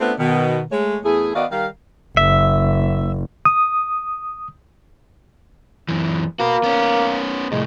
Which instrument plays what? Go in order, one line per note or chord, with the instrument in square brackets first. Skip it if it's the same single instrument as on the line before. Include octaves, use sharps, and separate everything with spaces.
[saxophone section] A3 B3 C4 D4 F4 B4
B2 D#3
G#3 A3 C#5
E2 A3 E4 G#4
D#3 B3 F#4 D5 D#5 F5
D#3 G3 A#4 F5
[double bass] F#1 [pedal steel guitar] E5
[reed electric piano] D#6
[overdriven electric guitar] F#2 E3
[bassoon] A#3 [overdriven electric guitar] F#4 B4
[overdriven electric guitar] B3 C#4
[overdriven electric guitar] C2 A2 [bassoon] G#3